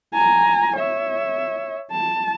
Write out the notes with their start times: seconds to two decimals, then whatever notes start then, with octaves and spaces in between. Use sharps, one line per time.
0.13 G#5 A#5
0.77 C#5 E5
1.91 A5